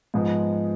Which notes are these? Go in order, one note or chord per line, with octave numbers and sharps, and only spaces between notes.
G#2 F3 G#3 B3